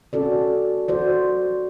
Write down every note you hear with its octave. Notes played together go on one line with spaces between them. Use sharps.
C#4 F#4 A4 D5
F#4 C5 D5